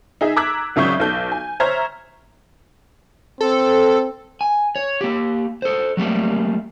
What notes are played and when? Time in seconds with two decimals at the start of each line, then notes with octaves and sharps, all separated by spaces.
0.21 D#4 G#4 E5
0.36 A#5 D6 E6 F#6 G#6 B6
0.76 G#1 C#3 F#3 E5 C#6 G6
1.00 B1 A4 G6
1.32 G#5
1.60 C5 C#5 E5 A#5 F6 G#6
3.41 C4 A4
4.41 G#5
4.76 C#5
5.01 A#3 G4
5.62 A4 C5
5.97 F#3 G3 A3 A#3